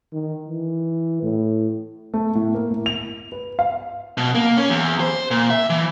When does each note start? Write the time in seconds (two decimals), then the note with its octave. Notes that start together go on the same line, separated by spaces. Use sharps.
0.13 D#3
0.48 E3
1.23 A2
2.14 A3
2.35 A2
2.54 A#3
2.70 A2
2.86 F7
3.32 B4
3.59 F5
4.18 B2
4.35 A#3
4.57 C#4
4.70 E2
5.00 C5
5.31 A#2
5.50 E5
5.70 E3